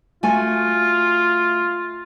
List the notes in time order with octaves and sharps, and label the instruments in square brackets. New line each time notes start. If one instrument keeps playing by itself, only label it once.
[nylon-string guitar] A3 F#4 G#5 [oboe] F4